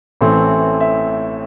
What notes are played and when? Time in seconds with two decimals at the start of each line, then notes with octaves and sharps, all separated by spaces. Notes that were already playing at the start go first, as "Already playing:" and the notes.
0.21 A1 A2 E3 A3 C4
0.81 E5